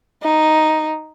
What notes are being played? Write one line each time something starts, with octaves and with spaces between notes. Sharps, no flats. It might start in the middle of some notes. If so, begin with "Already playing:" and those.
D#4